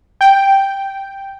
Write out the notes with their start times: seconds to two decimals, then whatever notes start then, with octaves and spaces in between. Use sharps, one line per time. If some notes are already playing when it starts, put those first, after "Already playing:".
0.21 G5